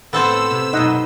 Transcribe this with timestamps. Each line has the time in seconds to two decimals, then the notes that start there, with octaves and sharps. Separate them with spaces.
0.13 A2 B3 C4 A4 C5 E6
0.51 C3
0.73 F#2 B2 D#4 D#5 F#5